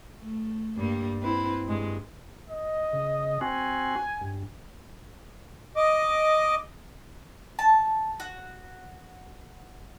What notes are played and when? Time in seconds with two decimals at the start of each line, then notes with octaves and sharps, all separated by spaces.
0.21 A3
0.76 G2 G3 A#3
1.22 C4 E4 B4
1.64 G2 G#3
2.49 D#5
2.93 C#3
3.41 C4 F#4 G#5
4.21 G2
5.76 D#5 D6
7.59 A5
8.20 F#4